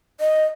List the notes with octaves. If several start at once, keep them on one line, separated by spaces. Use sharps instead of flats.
D#5